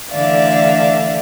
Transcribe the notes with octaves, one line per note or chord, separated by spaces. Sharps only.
D3 E3 A3 D5 E5 F5